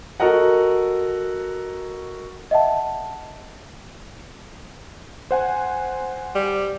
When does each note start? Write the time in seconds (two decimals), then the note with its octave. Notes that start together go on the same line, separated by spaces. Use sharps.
0.20 F#4 A4 A#4 D#5 F#5
2.51 D#5 E5 F#5 A5
5.31 C5 F#5 G#5
6.35 G3